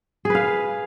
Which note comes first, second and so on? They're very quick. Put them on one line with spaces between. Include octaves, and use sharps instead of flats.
G#4 B4 F5